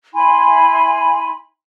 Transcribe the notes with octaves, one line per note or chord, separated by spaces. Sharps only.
E4 G#5 B5 C6